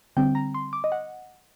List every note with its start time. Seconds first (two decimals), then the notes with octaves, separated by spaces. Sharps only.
0.17 D3 G3 C4 G5
0.35 A#5
0.54 C6
0.73 D6
0.84 D#5
0.92 F#5